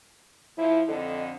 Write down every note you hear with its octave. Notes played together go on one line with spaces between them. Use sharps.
F3 E4
F2 D3 A4 D#5